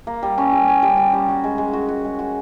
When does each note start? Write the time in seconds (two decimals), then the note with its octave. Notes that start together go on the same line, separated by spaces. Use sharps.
0.07 A#3
0.23 G3
0.38 C#4
0.52 G3
0.68 C#4
0.82 G3
0.97 G3
1.13 G3
1.28 F#4
1.44 G#3
1.58 G#3
1.73 F#4
1.88 F#4
2.04 G#3
2.19 F#4